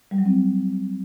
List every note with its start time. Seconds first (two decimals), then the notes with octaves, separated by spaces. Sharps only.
0.11 G3
0.18 F#3
0.25 C4